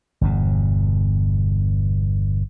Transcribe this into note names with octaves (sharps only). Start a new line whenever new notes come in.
G1 E2 B2